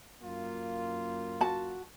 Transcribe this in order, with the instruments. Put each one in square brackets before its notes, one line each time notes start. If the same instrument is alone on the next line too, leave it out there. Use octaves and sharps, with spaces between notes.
[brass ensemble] F#2 A#3 F4
[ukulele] F#4 A5